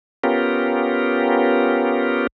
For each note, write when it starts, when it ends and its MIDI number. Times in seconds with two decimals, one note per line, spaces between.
0.24 2.27 59
0.24 2.27 61
0.24 2.27 65
0.24 2.27 67
0.24 2.27 70